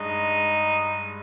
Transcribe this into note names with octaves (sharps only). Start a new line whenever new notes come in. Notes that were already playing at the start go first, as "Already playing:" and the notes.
Already playing: G2 G#3 D#4